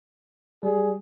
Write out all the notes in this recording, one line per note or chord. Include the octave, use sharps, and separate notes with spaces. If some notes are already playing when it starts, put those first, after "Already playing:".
G3 G#4